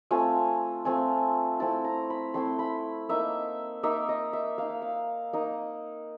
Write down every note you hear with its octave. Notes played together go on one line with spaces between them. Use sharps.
A3 C4 F4 G#5
A3 C4 F4 G#5
A3 C4 E4 A5
A#5
B5
A3 C4 E4 C6
B5
A#3 D#4 E5
A#3 D#4 E5
D#5
E5
A#3 D#4 F5
E5
F5
A#3 D#4